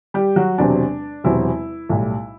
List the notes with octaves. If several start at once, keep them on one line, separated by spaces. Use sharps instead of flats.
G3 G4
F#3 F#4
E1 E2 C3 F#3 C4 D4
E1 E2 C3 F#3 C4 E4
B1 A2 G3